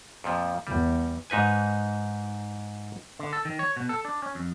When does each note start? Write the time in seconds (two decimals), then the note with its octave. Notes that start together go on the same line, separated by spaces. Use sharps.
0.24 F2 A#2 F3
0.67 E2 G3
1.30 G#2 D#4 B4 G#5
3.19 D3
3.33 A4
3.45 D#3
3.59 C#5
3.77 B2
3.89 A4
4.05 D4
4.22 C#4
4.35 F2